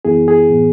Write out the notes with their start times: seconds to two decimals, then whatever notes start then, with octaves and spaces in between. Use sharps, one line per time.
0.05 F#2 E3 B3 E4 G#4
0.28 G#4
0.50 A2 E3 B3